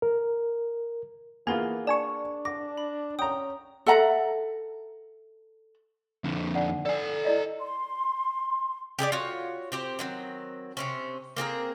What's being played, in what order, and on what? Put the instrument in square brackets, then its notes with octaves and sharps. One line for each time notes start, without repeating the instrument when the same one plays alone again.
[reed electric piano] A#4
[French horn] E3 [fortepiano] A#3 B3 F4 [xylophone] G#4 A#4 [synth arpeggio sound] G#5
[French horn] D4 [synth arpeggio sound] D5 G#5 C#6 [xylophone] A5
[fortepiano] D6 [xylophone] A#6
[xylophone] B5
[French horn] C#4 [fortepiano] G5 A#5 [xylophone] D#6
[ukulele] A4 E5 F#5 A#5
[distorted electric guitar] F2 D3
[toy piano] D#4 D5 F#5
[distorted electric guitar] A4 G#5 [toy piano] D5
[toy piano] E4 D5 D#5
[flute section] C6
[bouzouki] G4 G#4 B4 D5
F4 F#4 C#5
C4 G4 C5
D#3 F#3 C4
C3 C4 C#4
A#3 C4 G#4 A#4